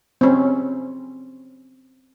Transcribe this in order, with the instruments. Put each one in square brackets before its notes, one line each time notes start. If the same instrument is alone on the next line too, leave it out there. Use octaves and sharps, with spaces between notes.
[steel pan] C4 C#4